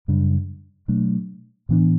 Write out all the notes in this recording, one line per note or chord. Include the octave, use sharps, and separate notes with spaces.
F#2 C#3 G3 D4
B2 F#3 A3 D4
A2 E3 B3 D4